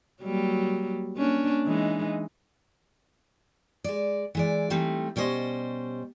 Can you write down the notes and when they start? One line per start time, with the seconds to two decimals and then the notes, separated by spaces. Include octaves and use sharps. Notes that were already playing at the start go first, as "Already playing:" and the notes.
0.22 F#3 G3 A#3
1.16 A#3 C#4 D4
1.65 E3 G#3 D#4
3.84 G#3 D5
4.35 E3 G#3 D5
4.70 E3 G3 A3 C4 D#4
5.16 B2 G3 C#4 C5 D#5